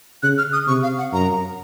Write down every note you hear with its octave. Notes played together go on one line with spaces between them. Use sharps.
C#3 F#6
F6
D#6
C3 C#6
F5
F#5
F#2 A#5